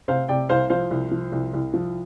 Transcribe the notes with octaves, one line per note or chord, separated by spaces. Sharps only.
C3 C5 F5
C3 D5 G5
C2 C5 F5
F3 C5 F5
C2
F3
C2
C2
F3